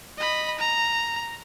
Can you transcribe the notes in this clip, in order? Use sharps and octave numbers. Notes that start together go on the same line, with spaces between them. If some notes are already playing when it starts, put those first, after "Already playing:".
D#5 B5
A#5